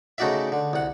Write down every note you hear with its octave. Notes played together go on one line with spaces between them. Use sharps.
C#3 A3 D#4 F#4 D5 E5
D3
C2 F#5